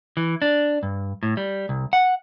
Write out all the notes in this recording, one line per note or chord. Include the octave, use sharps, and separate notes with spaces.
E3
D4
G2
A2
G3
C2
F#5